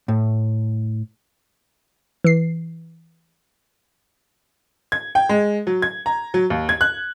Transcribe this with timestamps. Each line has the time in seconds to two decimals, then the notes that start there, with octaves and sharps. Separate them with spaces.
0.08 A2
2.25 E3 C7
4.92 G#6
5.15 G5
5.29 G#3
5.67 F#3
5.82 G#6
6.06 A#5
6.34 F#3
6.50 D#2
6.69 G#6
6.81 F#6